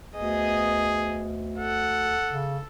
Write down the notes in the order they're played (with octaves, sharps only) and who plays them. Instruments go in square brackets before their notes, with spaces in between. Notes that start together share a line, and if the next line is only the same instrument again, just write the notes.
[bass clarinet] D2 [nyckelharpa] B3 D#5 [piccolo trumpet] G#4
[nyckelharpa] A4 [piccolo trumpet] F#5
[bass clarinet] C#3